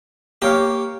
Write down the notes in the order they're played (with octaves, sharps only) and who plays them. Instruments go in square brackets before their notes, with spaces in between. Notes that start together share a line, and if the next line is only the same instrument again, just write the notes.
[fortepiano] A#3 C#5 F5 [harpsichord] G4